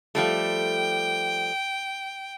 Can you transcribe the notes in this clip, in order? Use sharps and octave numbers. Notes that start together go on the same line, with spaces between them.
F3 G3 A3 G5